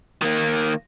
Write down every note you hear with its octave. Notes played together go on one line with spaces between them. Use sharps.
D#3 A#3